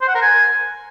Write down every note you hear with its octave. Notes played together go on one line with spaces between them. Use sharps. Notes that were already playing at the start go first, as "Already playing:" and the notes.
C5
F#5
A#4
G#5